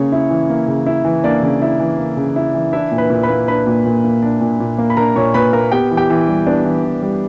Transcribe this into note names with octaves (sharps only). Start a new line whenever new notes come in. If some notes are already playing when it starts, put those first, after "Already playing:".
Already playing: C#3 A#3 C#4 C#5
E4
E3
A#3
C#3
E4
E3
A#3 D4 D5
C#3
E4
E3
A#3
C#3
E4
E3
D4 E4 E5
A#2
B4 B5
A#2
B4 B5
A#3
D4 B4 B5
A#2
A#2
A#3
D4
A#2
A#2
A#3
B5
D4 A#4 A#5
A#2 C#5 C#6
A#2 B4 B5
A#3 A#4 A#5
B3 G4 G5
E3
G4 G5
E3
G3
B3 D4 D5
E3
E3
G3